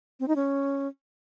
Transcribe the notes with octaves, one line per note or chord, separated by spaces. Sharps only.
C4
D#4
C#4